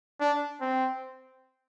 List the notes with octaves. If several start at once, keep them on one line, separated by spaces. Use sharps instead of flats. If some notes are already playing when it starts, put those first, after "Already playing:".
D4
C4